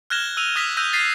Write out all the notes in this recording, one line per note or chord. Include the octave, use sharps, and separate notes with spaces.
F6 F#6 G#6 A#6 E7 G7
E6 D#7 F7
D#6 F6 G#6 A#6 B6
E6 F#6 G6 A#6 D#7
A6 B6 C7 D#7